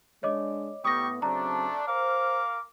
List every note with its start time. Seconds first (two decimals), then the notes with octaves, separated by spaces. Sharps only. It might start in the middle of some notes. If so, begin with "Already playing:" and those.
0.23 G#3 D4 C#5 D#5 D6
0.85 A2 G3 B3 G4 C#6 D#6 A#6
1.22 C#3 F#3 A3 C4 D4 A#5
1.88 A#4 C5 F5 D6